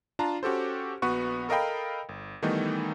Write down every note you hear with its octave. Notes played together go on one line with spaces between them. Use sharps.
D4 F4 A5 A#5
C#4 F#4 G4 A4 C5
A#1 B3 F#4 B4 C#6
A4 A#4 D#5 F5 G5 B5
G1
D#3 E3 G3 A3 B3 D#4